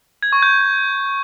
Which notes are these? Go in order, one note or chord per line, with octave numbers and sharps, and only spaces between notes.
G#6
C#6
G6